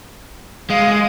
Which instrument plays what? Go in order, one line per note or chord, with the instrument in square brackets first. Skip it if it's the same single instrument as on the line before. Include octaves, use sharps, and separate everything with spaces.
[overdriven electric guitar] G#3 [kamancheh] F5 D#6